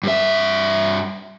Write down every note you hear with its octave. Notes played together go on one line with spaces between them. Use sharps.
G2 E5